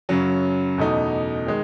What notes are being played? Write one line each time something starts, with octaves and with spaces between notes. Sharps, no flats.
F#2 C#3 F#3
E2 B2 A3 D#4
D#3 G#3